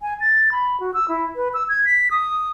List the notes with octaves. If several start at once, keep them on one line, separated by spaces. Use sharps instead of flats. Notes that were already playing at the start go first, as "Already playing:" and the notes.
G#5
A6
B5
F#4
E6
E4
B4
E6
G#6
B6
D#6